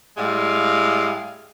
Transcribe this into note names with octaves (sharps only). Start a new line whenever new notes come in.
A2 G3 G#3 F5